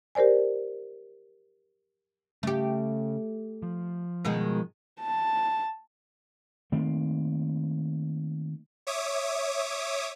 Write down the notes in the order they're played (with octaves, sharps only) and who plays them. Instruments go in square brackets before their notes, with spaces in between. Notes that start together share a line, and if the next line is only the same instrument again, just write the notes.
[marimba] G4 A#4 C5 D5 G#5
[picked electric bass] C#3 [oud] A3 G4
[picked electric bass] F3
[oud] B2 D#3 G#3
[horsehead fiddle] A5
[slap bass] D#3 A3 A#3 C4
[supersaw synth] C#5 E5 D6 D#6